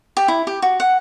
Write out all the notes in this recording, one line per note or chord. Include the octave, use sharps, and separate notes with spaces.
G4
E4
G4
F#4
F#5